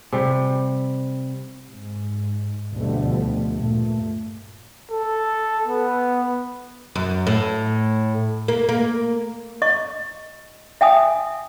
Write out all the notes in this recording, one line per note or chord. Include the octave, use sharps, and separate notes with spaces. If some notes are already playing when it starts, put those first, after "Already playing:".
C3 G3
G#2
D2 B2 D3 F3 G3 A3
G2 A#2 A3
A4
B3
F#2
A2
A#3
A#3
D#5 C#6
E5 G5 G#5 D#6